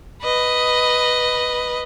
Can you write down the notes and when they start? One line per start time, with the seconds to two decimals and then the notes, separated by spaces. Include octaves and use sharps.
0.22 B4 D#5